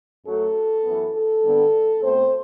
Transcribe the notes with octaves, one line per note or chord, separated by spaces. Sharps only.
F#2 F#3 A3 A4
F#2 E3 B3
A4
G2 D3 G3 B3
B2 A3 C4 C5